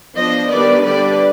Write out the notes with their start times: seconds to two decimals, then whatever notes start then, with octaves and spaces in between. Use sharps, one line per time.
0.16 F3 B3 D4 C5 D#5
0.50 D#3 G3 B3 D4 B4 D5
0.84 D3 G3 D4 B4 D5